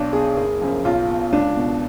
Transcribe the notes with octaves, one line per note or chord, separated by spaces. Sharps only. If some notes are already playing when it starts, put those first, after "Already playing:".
Already playing: B1 D4
B2 G#4
F#1 G#4
F#2 F3
B1 F4
B2
C#2 D4
B2